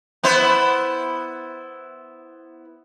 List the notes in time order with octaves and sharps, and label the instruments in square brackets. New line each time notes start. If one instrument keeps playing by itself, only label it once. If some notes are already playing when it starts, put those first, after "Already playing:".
[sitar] B3 E4 C5